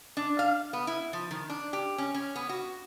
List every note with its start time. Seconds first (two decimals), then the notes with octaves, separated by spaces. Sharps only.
0.17 D4
0.39 F5
0.73 B3
0.87 E4
1.13 F3
1.31 D#3
1.50 D4
1.73 G4
1.98 C#4
2.14 C#4
2.35 B3
2.49 F#4